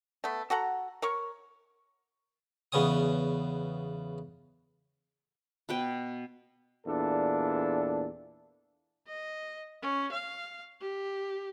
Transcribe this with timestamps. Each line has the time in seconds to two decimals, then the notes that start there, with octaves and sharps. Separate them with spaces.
0.24 A3 B3
0.50 F#4 A4 F#5 A#5
1.02 A#4 C#5 C#6
2.72 E2 C#3 B3 C#4 G#5 D#6
5.69 B2 B4 G5
6.87 E2 A#2 D4 A4
9.07 D#5
9.82 C#4
10.12 F5
10.81 G4